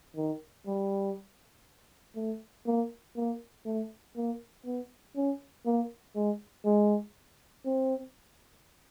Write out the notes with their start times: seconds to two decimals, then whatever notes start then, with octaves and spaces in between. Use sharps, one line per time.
0.16 D#3
0.67 G3
2.16 A3
2.67 A#3
3.16 A#3
3.65 A3
4.16 A#3
4.65 B3
5.16 C#4
5.66 A#3
6.15 G#3
6.65 G#3
7.65 C4